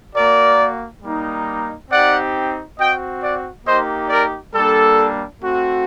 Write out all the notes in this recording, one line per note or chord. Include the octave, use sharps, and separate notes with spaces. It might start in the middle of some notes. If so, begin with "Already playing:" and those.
A#3 F#4 A#4 D5
G3 A#3 D#4
C4 D#4 G4 D5 F#5
C4 F#4 D#5 G5
D5 F#5
A#3 D#4 G4 C5 D#5
A#4 D5
G3 A#3 D4 A4
A3 C4 F#4